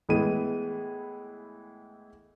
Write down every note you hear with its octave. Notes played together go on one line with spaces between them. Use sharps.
A2 E3 G#3 B3 D#7